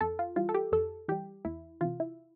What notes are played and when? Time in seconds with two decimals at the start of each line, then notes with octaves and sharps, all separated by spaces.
0.01 F2 A4
0.19 F4
0.36 E3 G3 F4
0.49 A4
0.54 G4
0.72 F2 A4
1.08 E3 G3 G4
1.45 E2 E4
1.81 C3 E3 F4
2.00 E4